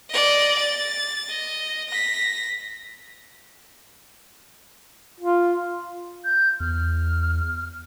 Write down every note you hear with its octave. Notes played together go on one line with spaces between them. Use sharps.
D5 D#5
A6
D#5
A#6 B6
F4
G6
E2 F6